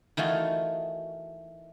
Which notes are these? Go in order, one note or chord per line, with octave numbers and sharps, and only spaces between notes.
D#3 E3 A3 F4 F#4